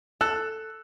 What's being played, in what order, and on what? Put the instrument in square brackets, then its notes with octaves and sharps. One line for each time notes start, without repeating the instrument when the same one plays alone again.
[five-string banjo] A4 [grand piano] E6 F#6